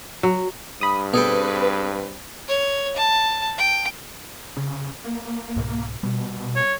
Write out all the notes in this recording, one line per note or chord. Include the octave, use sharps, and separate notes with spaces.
F#3
G2 B5 D#6
B2 C4 G#4 A4 B4 G5
C#5
A5
G5
C#3
A#3
C2 G#2 B2
B2 G3
C#5